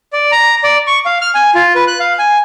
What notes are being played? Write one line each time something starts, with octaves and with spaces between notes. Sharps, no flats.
D5
A#5
D5
C#6
F5
F6
G#5
F4
B4
F#6
F5
G#5